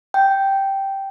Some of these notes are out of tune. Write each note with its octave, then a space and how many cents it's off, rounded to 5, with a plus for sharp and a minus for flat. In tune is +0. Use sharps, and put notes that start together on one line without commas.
G5 -5